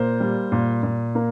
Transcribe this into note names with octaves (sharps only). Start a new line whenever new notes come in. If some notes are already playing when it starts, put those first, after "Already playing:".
Already playing: A#2 A#3 C5
G3
A#2
A#2
A#3